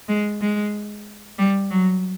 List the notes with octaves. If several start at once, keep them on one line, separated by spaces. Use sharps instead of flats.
G#3
G#3
G3
F#3